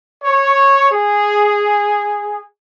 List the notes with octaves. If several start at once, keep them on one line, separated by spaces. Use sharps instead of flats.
C#5
G#4